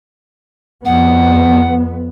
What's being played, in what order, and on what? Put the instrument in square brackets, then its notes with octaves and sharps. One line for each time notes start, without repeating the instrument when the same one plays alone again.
[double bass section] F2 B3 [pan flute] F#5